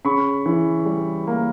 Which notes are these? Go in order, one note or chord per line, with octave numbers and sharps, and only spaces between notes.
C#3 B5 C#6
E3
G3
A#3